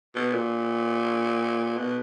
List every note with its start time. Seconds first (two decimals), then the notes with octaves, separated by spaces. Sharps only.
0.15 B2
0.34 A#2
1.78 B2